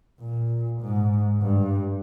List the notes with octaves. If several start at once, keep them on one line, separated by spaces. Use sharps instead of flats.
A#2
G#2
G2